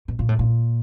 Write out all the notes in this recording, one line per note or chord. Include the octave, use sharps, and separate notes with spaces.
B2
A#2
A2
A#2